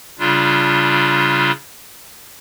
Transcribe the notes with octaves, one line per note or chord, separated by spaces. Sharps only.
C#3 G3 D4 F4